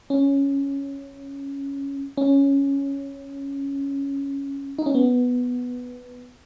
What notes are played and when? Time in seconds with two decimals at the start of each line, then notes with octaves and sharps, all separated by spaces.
0.10 C#4
2.17 C#4
4.78 D#4
4.86 C#4
4.95 B3